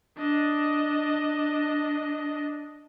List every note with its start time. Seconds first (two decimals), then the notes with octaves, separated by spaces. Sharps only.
0.18 D4 D#5